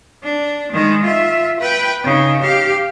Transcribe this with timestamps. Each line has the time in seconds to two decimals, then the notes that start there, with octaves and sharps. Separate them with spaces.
0.24 D4
0.72 D#3 G#3
1.03 F4 E5
1.60 B4 G5
2.04 C#3 D#4
2.41 G4 F5